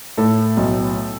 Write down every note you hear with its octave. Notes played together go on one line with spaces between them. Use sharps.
A2 A4
B1